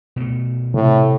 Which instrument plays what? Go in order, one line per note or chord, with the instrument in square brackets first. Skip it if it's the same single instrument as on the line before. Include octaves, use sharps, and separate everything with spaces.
[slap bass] B2 A3
[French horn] A2 [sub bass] C3